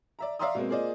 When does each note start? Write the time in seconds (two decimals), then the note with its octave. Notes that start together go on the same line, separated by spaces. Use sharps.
0.19 D5 E5 A#5
0.39 D5 E5 F5 A#5 C6 D#6
0.55 B2 G#3 A#3 C4
0.69 A#3 F4 G#4 C5 D5 D#5